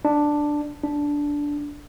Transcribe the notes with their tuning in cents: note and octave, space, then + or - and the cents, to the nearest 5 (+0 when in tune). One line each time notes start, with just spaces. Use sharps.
D4 +5
D4 -10